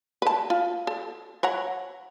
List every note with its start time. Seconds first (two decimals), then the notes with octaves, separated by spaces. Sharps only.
0.22 B4 A5
0.50 F4
0.87 A4
1.43 C#5 F#5 A#5